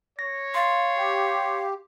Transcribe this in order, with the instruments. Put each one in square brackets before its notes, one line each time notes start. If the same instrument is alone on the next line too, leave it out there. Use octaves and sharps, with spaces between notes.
[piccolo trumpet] C#5 [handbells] A#6
[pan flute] F5 [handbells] C6 A6
[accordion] G4